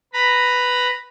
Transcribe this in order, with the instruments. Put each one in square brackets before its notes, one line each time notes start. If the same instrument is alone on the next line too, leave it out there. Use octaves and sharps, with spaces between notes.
[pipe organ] B4 A#5 B5